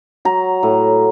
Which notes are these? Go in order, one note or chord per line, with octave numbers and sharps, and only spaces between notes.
F#3 A#5
A2